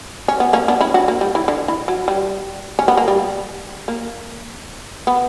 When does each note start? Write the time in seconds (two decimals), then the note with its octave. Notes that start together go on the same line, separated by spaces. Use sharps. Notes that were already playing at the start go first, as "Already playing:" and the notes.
0.28 C#4
0.40 B3
0.53 A#3 C#4
0.68 B3 D4
0.81 C#4 E4
0.94 D4 F#4
1.08 A#3
1.21 G3
1.35 E3
1.48 D3
1.68 E3
1.88 F#3
2.08 G3
2.79 C#4
2.88 B3
2.97 A#3
3.08 G3
3.88 A#3
5.07 B3